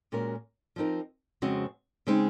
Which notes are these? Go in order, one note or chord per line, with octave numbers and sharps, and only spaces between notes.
A#2 G#3 C#4 F#4 A#4
F3 C4 D#4 A#4
F2 C#3 G#3 C4 F#4
C#3 G#3 C4 D#4